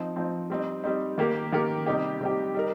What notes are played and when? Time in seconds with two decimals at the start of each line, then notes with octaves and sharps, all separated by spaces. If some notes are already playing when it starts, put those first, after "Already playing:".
Already playing: F3 C4 D#4
0.16 F3 C4 D#4
0.50 G3 C4 D#4
0.84 G3 C4 D#4
1.18 D#3 A#3 G4 A#4
1.52 D#3 A#3 G4 A#4
1.86 C3 G3 D#4 G4
2.21 C3 G3 D#4 G4
2.54 G3 D#4 A#4